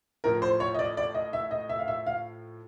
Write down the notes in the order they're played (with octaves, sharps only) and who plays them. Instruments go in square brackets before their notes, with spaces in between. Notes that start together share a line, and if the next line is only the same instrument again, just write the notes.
[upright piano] A2 F3 A#4
C5
C#5
D#5
D5
D5
D#5
E5
D#5
E5
F5
E5
F5